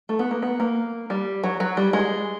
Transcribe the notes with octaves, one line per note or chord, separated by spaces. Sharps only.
A3
B3
A#3
B3
A#3
G3
F#3
F#3
G3
G#3